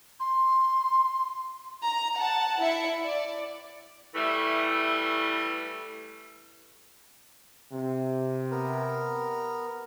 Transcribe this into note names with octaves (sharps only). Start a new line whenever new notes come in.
C6
A#5
F#5 A5
E4 E5 C#7
D5
E3 G3 A3
C3
B3 A#4